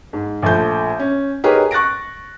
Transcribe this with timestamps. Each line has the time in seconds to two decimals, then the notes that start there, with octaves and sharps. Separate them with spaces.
0.13 G#2
0.42 A#1 F3 A3 G6
0.99 C#4
1.44 D#4 G4 G#4 A#4 B4 C#5
1.71 C#6 F#6 A6 A#6 D7